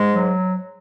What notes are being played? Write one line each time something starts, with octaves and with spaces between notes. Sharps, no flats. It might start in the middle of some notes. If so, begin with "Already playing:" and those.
Already playing: G#2 G#3
F#3